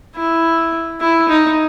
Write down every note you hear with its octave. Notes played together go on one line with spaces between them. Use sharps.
E4
E4
D#4